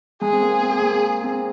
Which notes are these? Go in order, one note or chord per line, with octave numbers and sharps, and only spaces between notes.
G#3 G#4
C4
A#3
C4
A#3
C4